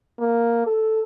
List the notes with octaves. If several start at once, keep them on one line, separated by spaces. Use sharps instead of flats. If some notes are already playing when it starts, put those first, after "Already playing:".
A#3
A4